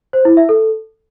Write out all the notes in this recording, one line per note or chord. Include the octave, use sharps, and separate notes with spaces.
C5
E4
E5
A4